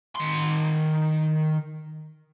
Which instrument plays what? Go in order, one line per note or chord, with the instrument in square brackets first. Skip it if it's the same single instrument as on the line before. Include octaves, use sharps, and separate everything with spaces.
[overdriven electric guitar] D#3 C6